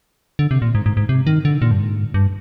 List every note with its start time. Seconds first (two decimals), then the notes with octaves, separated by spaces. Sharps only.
0.39 D3
0.51 C3
0.62 A#2
0.75 G#2
0.86 G#2
0.97 G#2
1.09 C3
1.27 D#3
1.45 D3
1.62 A#2
1.71 G2
1.80 G#2
2.14 G2